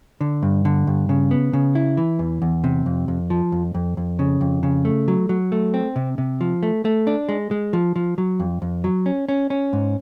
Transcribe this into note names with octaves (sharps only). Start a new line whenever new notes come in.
D3
G2
D3
G2
C#3
B3
C#3
E4
E3
E2
E2
C3
F2
F2
F3
F2
F2
F2
C#3
F2
C#3
A3
F#3
F#3
A3
C4
C3
C3
F3
A3
A3
D4
G#3
G#3
F3
F3
F#3
F2
F2
F#3
C#4
C#4
C#4
G#2